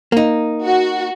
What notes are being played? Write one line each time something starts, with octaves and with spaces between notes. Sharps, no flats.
A#3 D#4
F#4